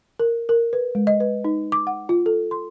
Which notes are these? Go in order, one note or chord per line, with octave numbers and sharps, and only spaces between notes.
A#4
A#4
B4
G#3
D#5
B4
D#4
D6
F#5
F4
A4
C6